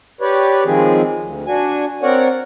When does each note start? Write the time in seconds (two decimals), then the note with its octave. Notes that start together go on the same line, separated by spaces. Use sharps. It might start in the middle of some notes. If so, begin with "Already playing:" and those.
0.21 G4 B4 C#5 D5
0.65 D#3 F3 G#3 C4 G#4
1.19 D2
1.46 D4 F#4 G#5
2.03 C4 A#4 C#5 D5 F#5